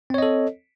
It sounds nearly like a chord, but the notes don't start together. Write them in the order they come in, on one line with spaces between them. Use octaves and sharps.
C4 C#5 D#5 A4